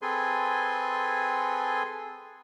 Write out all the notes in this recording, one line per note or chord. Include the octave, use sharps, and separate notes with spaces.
C4 G#4 A4 B4 G#5 C6